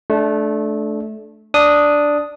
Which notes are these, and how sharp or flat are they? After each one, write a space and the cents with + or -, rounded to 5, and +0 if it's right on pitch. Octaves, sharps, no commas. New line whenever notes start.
A3 -20 D4 +0
D4 +0 D#6 +0